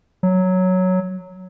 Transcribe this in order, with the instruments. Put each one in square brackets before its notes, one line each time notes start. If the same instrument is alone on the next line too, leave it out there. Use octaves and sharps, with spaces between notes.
[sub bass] F#3